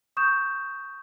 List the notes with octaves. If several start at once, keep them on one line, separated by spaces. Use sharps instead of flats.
C#6 D#6 G6 E7